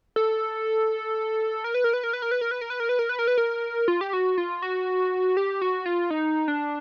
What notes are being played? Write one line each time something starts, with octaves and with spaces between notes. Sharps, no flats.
A4
A#4
B4
A#4
B4
A#4
B4
A#4
B4
A#4
B4
A#4
B4
A#4
B4
A#4
B4
A#4
B4
A#4
F4
G4
F#4
F4
F#4
G4
F#4
F4
D#4
D4